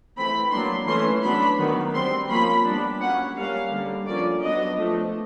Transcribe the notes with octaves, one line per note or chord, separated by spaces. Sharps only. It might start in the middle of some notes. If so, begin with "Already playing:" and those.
E3 A3 C4 B5
F#3 A#3 D4 C6
E3 A3 C#4 C6
F#3 B3 D4 B5
D#3 F#3 B3
G3 C4 C6
F3 A#3 C#4 B5
G3 B3 D4
F#3 A#3 C#4 F#5
G3 A#3 C#4 F5
D3 G3 A#3
D3 F3 A#3 C#4 D5
F#3 B3 D4 D#5
F3 A3 D4